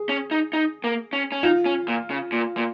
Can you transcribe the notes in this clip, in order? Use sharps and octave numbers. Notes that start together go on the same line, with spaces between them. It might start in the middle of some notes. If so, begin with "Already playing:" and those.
Already playing: G#4
C#4
D#4
D#4
A#3
C#4
C#4
D#4 F4
C#4
A#2
C#3
A#2
A#2